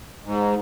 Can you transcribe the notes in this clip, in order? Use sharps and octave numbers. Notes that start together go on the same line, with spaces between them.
G#2